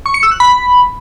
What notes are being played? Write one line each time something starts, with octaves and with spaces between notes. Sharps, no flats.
C#6
C#7
E6
F#6
B5